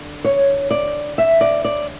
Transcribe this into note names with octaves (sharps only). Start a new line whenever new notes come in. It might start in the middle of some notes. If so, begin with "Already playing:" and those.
Already playing: D3
C#5
D5
E5
D5
D5